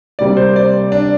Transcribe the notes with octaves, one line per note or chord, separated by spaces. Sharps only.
C3 G3 A#3 D5
C5
D5
D4